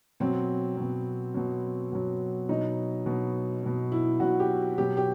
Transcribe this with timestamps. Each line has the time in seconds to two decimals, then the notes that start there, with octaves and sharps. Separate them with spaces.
0.20 B2 F#3 C4
0.77 B2 F#3
1.34 B2 F#3
1.92 B2 F#3
2.49 B2 F#3 D#4
3.06 B2 F#3
3.63 B2 F#3
3.92 E4
4.20 B2 F#3 F#4
4.40 G4
4.78 B2 F#3 G4
4.97 G4